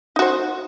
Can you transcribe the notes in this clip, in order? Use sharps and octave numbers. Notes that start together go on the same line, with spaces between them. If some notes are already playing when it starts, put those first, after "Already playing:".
D#4 F#4 C5